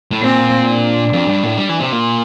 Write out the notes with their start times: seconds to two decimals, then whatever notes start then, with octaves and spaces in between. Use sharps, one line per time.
0.11 A2
0.22 A#2 C4
0.68 D4
1.13 F2
1.28 G2
1.43 A2
1.57 G3
1.69 E3
1.80 C3
1.92 A#2